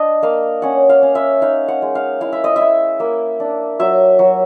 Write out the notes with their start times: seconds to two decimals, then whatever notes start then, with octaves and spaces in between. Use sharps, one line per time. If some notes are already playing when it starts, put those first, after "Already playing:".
Already playing: D4 D#5
0.22 A#3 F5
0.62 C#4 F#5
0.89 F5
1.02 C#4
1.15 E5
1.42 D#4 F5
1.68 F#5
1.82 G#3
1.95 F5
2.21 E4 F5
2.33 E5
2.44 D#5
2.56 E4 E5
3.00 A#3
3.40 D4
3.79 F#3 E5
4.19 F#3